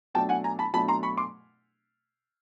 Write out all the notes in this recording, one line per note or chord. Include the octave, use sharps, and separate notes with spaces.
B2 F#3 A3 D4 G5 A5
F#5 G#5
G#5 A#5
A5 B5
B2 F#3 A3 D4 A5 B5
A#5 C6
B5 C#6
C6 D6